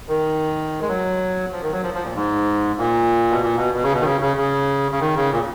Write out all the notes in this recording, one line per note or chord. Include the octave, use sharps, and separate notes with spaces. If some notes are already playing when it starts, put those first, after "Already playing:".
D#3
G#3
F#3
F3
D#3
F#3
F3
F3
A#2
G#2
A#2
B2
A#2
B2
B2
C#3
B2
D#3
C#3
C#3
C#3
C#3
D#3
C#3
A#2